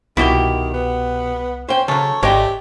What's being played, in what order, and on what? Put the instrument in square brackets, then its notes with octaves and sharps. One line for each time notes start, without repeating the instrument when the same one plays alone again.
[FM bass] C2 [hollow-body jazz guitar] B2 G5 [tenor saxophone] D#3 [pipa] E4 F#4 G4
[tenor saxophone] B3
[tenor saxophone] C#4 [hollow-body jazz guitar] C5 G5
[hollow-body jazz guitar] C#3 [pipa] F#3 A4 [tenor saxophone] C#5
[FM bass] G#1 [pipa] G#3 A3 D4 [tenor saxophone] G4 [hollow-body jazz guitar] C#5 D#5 G5